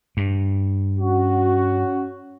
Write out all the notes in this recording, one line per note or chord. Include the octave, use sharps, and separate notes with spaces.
G2
C#4 F#4